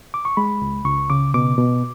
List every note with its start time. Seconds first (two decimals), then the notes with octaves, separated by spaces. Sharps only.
0.14 D6
0.25 C#6
0.37 G#3 B5
0.62 C#2
0.85 C#2 C#6
1.10 C#3 D6
1.34 B2 D6
1.58 B2